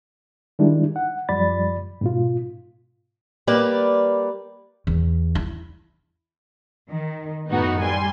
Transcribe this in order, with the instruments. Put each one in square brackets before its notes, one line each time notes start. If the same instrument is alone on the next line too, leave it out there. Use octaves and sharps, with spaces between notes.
[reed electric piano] D#3 G3 G#3 D4 E4
F#5
F#2 F3 G3 D5 B5 A6
G#2 B2 F4
[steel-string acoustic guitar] G3 A#3 B4 D5
[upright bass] E2
E4
[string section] D#3
F#2 A2 B3 D#4 F#4
G3 G#5 C6